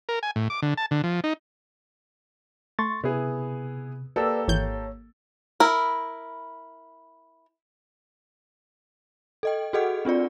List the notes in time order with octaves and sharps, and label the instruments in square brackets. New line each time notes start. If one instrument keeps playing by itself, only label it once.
[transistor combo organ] A#4
G#5
A2
D6
D3
A5
D3
F3
D#4
[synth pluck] A3 [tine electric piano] C6 C#6 A6
[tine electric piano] C3 [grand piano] B3 E4 G#4
[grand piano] A#3 G4 A4 [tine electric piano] B4 D5 E6
[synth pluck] G#1 E3 G6 [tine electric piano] C#5
[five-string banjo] E4 A#4
[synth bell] A4 D#5 G5
F#4 G#4 A4 D#5 F#5
C4 D4 F4 D5